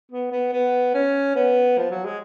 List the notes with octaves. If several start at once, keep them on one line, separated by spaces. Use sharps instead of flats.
B3
B3
B3
C#4
B3
F3
F#3
G#3